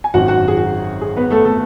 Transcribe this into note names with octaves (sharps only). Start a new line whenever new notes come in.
G#5
G#1 F#2 D#3 F#3 F#4 F#5
F#4 F#5
G#4
F#4
G#4
B3 B4
A3 A4
A3 A4